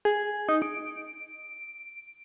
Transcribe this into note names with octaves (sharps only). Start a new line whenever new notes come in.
G#4
D#4
D7